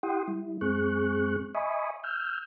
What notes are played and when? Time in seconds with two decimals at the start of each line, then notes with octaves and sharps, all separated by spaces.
0.03 E4 G4 F#5 G5 C6 D#6
0.28 G3 E4
0.61 F#2 G#3 C4 G#4 C#6 F#6
1.55 D#5 E5 G#5 B5 C#6 D#6
2.04 E6 F6 G6